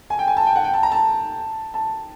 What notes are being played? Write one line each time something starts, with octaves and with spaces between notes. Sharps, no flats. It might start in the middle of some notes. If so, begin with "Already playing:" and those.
G#5
G5
G#5
A5
G5
F#5
G5
A5
A#5
A5
A5